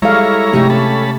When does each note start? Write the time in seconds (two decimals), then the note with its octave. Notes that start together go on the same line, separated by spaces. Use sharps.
0.02 G3 G#3 E4 A4 C#5 F5 A#5
0.53 C3 A3 C#4 D#4 G4 G#4
0.70 C#4 A4 A5 B5